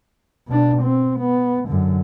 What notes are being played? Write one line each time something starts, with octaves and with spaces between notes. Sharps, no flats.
B2 D4
C4
B3
F#2 D3